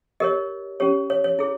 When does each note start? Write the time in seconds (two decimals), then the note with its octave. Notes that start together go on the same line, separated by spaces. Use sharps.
0.20 G4 A#4 C#5 D#5
0.80 C#4 G4 C#5
1.10 C#5
1.24 C#5
1.39 E4 G#4 C#5